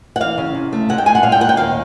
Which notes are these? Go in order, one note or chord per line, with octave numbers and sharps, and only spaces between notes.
F#5
E3 F5
C#3
C3
A3
G#3 F#5
G5
G#3 G#5
F#5
A#2 F5
G5
A#2 F#5
G5
D#2 F5